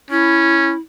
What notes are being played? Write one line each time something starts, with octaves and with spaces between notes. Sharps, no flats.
C#4 E4